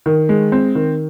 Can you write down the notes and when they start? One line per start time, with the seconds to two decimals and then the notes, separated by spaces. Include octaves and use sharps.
0.06 D#3
0.29 G#3
0.52 C4
0.75 D#3